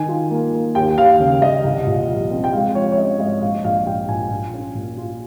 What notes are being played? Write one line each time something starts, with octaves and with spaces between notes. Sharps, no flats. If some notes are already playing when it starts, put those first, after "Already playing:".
Already playing: D#3 G#5
F4
A#3
A#3
D#2 G5
D#2 F5
C#3
D#2 D#5
C2
A#2
F3
C4
G5
G#3 F5
F3 C#5
C#5
C#4 D#5
G#2 D#5
A#1 F5
A#1 F5
A#1 G5
A#2 G#5
A#2
C#4
A#2
F4